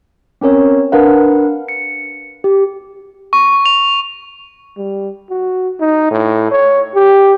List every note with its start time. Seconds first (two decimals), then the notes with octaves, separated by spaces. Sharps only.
0.41 C4 C#4 A#4 C#5
0.92 D4 A#4 B4 F5 F#5
1.69 C#7
2.44 G4
3.33 C#6
3.66 F7
4.77 G3
5.30 F#4
5.80 D#4
6.11 A2
6.51 C#5
6.95 G4